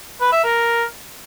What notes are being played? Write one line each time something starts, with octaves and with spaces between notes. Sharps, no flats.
B4
E5
A#4